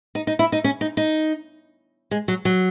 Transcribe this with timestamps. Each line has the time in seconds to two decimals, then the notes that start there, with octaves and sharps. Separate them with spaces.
0.15 D#4
0.27 D#4
0.39 E4
0.52 D#4
0.64 C#4
0.81 D#4
0.97 D#4
2.11 G#3
2.28 F#3
2.45 F#3